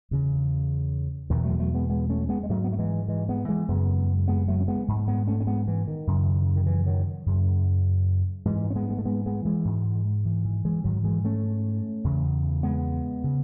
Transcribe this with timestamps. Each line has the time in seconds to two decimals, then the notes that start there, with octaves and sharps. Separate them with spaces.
0.11 E2 C#3
1.30 E2 B2 D#3
1.44 F#3 A3
1.60 F#3 A3
1.74 G#3 B3
1.90 G#3 B3
2.10 A3 C#4
2.29 G#3 B3
2.43 G#3
2.49 G#2 F#3 A3
2.64 B3
2.72 A3
2.79 E3 G#3
3.08 E3 G#3
3.29 G#3 B3
3.48 E3 G#3
3.69 F#2 C#3 G#3 B3
4.28 G#3 B3
4.48 F#3 A3
4.60 C#4
4.68 G#3 B3
4.88 G#2
5.08 G#3 B3
5.27 A3 C#4
5.40 C#4
5.47 G#3 B3
5.68 E3
5.88 D#3
6.07 F#2 C#3
6.56 D#3
6.66 E3
6.87 D#3 F#3
7.26 F#2 C#3
8.45 G#2 E3 G#3
8.70 C#4
8.75 G#3 B3
8.90 G#3
8.98 A3
9.05 G#3 B3
9.26 G#3 B3
9.45 E3 G#3
9.65 G#2
10.25 E3
10.45 E3
10.65 E3 G#3
10.84 G#2 D#3 F#3
11.04 E3 G#3
11.25 A3 C#4
12.04 E2 C#3
12.63 G#3 B3
13.24 C#3